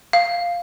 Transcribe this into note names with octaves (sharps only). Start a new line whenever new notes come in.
F5